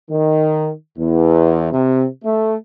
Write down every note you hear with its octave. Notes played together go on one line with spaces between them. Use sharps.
D#3
E2
C3
A3